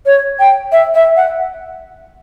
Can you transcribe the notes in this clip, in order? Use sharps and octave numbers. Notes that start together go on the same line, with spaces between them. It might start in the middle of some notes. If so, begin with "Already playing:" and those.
C#5
G5
E5
E5
F#5